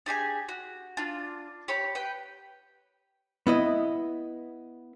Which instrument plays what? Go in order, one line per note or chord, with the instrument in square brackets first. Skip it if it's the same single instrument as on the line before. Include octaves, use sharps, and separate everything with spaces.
[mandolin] D4 G4 G#4 G#5
F#4
D4 F4
G4 C#5 B5
B4 G5
[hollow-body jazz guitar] B3 E4 D#5